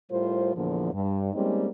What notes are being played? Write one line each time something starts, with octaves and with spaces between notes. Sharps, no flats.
A2 G3 F4 A#4 C5
E2 A#2 D3 F3
G2
G3 G#3 A#3 C4 C#4 D#4